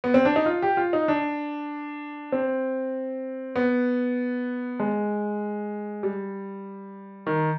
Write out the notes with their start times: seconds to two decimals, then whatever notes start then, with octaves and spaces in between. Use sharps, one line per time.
0.04 B3
0.14 C4
0.25 D4
0.36 D#4
0.46 F4
0.62 G4
0.77 F4
0.93 D#4
1.08 D4
2.32 C4
3.56 B3
4.80 G#3
6.03 G3
7.27 D#3